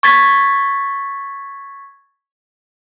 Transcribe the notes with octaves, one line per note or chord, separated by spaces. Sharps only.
C#6 G#6 A6 B6